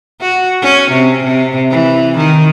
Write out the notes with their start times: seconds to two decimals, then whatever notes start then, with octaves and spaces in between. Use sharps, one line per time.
0.21 F#4
0.62 C#4
0.91 C3
1.23 C3
1.70 E3
2.17 D#3